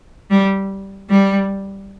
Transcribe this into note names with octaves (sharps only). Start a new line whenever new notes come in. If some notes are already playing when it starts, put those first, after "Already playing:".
G3
G3